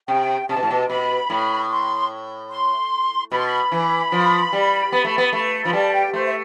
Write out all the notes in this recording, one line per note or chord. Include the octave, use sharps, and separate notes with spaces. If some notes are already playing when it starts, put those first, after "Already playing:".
C3 G5
C3 A5
B2
A2
B2
B2 B5
A2
C6
C6
B2 B5
C6
B5
E3
F3
G3
B3
A3
B3
A3
F3 B5
G3 A5
G5
A3 C5
E5